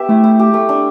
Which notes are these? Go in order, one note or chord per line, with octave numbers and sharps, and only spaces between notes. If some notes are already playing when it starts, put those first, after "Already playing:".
Already playing: B3 G4 E5
A3 E4
E4
G4
A3
D4